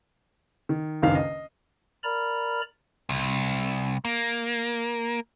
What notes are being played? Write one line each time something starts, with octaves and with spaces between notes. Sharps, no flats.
D#3
F#1 C#2 D#3 D4 F5
D#5
A#4 D5 A#5 B5 F6
C2
A#3